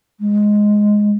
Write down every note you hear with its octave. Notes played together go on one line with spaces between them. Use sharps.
G#3